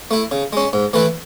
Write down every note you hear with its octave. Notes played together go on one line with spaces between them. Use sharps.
A3 E4
C#3
G#3 C#4
G#2
E3 A3 E4 B4